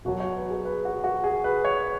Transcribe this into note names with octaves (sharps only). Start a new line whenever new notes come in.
B2 F#3 F#4
C#5
B4
G#4
B4
F#4
F#4
G#4
B4
C#5